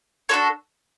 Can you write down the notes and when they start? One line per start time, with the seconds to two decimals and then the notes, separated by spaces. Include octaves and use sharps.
0.29 D4 F#4 A4 C#5